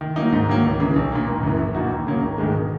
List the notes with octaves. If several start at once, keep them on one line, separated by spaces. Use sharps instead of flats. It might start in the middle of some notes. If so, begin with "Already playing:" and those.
D#3
F#3 A#3 D#4
G#2
D#3 F#3 A#3
C#2
C#3 E3
B1
A#2 A#3
G#1
F#2 C#3 E3
A#1
A#2 A#3 D#4 F#4
D#2
C#3 F#3 A#3
G#1
G#2 D#3 G#3
B2